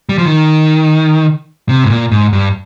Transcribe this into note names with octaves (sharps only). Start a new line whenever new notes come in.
G3
F3
D#3
C3
G#2
A#2
G#2
G2